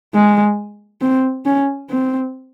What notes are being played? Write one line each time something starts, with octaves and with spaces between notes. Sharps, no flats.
G#3
C4
C#4
C4